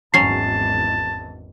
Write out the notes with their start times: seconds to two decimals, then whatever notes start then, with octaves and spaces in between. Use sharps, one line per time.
0.14 G#1 E2 F#3 C#4 A5 C7